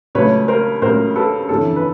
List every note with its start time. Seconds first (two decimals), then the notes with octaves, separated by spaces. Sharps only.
0.15 C#2 C#3 F#3 A3 B4 C#5
0.48 A#4 C5
0.82 C#2 C#3 F#3 A3 A#4 C5
1.15 A4 B4
1.49 G1 F2 C#3 E3 A4
1.76 B4